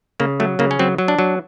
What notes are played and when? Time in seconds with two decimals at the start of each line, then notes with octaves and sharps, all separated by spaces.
0.20 C#3 A#3
0.40 F#3 A3
0.59 C#3 A#3
0.71 C#4
0.79 F#3 C4
0.98 F#3
1.08 D4
1.19 F#3